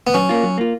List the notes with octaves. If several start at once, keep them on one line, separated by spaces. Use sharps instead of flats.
B3
F#3 C#4
A#3 F4
F#3
A#3 F4